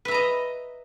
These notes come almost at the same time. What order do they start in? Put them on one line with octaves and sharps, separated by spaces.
B4 E5 A#5 D#5